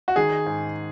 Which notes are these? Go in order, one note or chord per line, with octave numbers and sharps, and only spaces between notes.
F#4
D#3 G#4
G#2